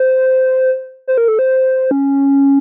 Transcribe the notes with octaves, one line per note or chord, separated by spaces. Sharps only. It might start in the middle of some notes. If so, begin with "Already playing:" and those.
Already playing: C5
C5
A#4
A4
C5
C#4